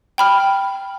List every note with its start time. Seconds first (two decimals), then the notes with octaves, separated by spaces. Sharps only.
0.18 G5 B5 F6